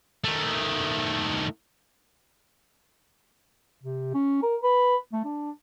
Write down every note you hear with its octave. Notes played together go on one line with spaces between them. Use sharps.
D#3 A3
C3
C#4
A#4
B4
A3
D4